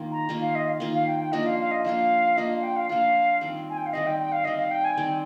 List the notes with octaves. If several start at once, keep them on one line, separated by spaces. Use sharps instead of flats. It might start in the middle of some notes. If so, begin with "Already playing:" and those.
Already playing: D#3 A#3 F4
A#5
D#3 A#3 F4
F5
D#5
F5
D#3 A#3 F4
F5
G5
G5
F3 A#3 D4 F4 D#5
F5
F5
D#5
F3 A#3 D4 F4 F5
F3 A#3 D4 F4 D#5
F5
G5
F5
F3 A#3 D4 F4 F5
D#3 G3 C4
G#5
G5
F5
D#3 G3 C4 D#5
G5
G5
F5
D#3 G3 C4 D#5
F5
G5
G#5
D#3 G3 C4 G5